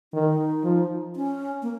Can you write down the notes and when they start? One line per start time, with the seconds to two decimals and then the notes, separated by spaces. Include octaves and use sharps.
0.13 D#3 D#4
0.64 F3
1.16 C#4
1.62 A#3